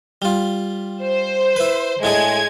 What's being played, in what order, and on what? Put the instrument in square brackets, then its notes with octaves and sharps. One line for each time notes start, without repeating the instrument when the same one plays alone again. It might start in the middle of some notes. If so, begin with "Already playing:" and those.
[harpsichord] G3 F4
[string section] C5
[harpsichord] E4 B4
[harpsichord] A2 D4 G#4 [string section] G#3 G#6